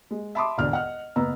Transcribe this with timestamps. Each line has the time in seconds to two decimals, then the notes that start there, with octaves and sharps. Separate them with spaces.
0.11 G#3
0.35 E5 A5 B5 C6 D6 D#6
0.58 E1 D2 D3 D5 F6
0.71 D#5 F#5 F6
1.16 F#1 B3 A#5 E6